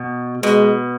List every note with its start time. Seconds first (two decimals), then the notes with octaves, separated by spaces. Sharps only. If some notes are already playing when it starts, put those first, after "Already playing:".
Already playing: B2
0.43 B2 G#3